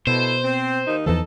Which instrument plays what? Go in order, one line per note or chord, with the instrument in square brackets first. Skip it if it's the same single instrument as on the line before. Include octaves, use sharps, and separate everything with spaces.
[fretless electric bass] B2 [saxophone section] E4 A4 [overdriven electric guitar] C5
[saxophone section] C4
D#2 D#3 D#4
[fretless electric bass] E2 E3 F3 [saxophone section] D#4 A4